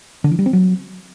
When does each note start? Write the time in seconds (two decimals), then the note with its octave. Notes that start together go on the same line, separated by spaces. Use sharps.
0.24 D3
0.31 E3
0.39 G3
0.46 C4
0.53 F#3